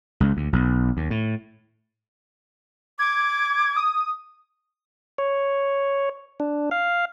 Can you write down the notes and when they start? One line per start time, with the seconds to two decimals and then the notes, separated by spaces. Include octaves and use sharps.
0.20 C#2
0.37 D2
0.53 B1
0.97 D#2
1.10 A2
2.99 D6 G#6
3.76 D#6
5.18 C#5
6.40 D4
6.71 F5